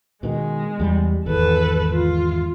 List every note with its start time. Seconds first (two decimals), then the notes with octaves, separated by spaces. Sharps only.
0.23 B2 D#3 G#3
0.80 E2 G3
1.26 G#1 E2 A4 B4
1.92 F4